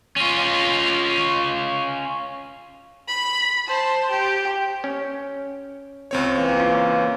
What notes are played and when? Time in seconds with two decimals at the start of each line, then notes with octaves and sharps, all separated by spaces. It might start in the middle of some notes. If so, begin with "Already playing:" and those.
0.16 C#4 F4
3.08 B5
3.67 C5 A5
4.10 G4
4.84 C#4
6.11 C#2 C4 C#5
6.36 E3 A#3
6.58 C#4 F4